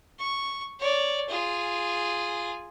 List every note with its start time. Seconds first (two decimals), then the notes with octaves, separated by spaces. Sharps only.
0.19 C#6
0.80 C#5 D5
1.29 F4 G#4